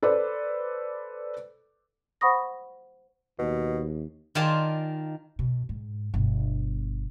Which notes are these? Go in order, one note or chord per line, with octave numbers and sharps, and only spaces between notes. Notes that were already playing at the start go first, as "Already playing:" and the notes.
A4 B4 C5 D5
C5 F#5 B5 C#6 D#6 A#6
D#2 B2
D#3 F4 D5 G#5 A5 C6
B2
G#2
G1 B2